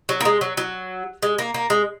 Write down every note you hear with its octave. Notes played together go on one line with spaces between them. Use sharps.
F#3
A#3
G#3
F#3
F#3
G#3
A#3
A#3
G#3